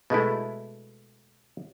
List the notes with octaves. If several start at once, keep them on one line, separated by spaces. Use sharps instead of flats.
B2 G#3 A3 E4